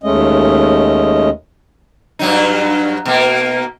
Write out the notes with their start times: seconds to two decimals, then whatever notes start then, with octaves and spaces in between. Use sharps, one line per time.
0.04 D#2 G#3 A3 C#4 D#5
2.19 G2 F#3 D#4
3.06 B2 A#3